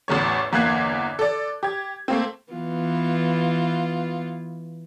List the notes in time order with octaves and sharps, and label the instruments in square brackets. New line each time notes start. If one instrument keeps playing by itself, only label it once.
[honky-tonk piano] A1 E2 A3 C#5
G1 E2 A#3 F#6 G#6 C7
A4 D5
G4 G#6
A3 A#3 C4
[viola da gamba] E3 B3 F4